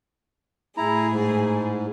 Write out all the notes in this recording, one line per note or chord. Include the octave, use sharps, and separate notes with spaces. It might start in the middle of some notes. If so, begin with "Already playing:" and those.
A2 E4 G#4 A#5
G#2